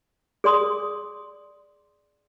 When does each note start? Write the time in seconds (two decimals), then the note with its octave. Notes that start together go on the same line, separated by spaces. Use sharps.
0.44 G#4 D5 C6 D#6